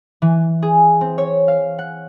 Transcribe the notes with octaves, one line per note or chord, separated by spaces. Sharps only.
E3
G#4
C4
C#5
F5
F#5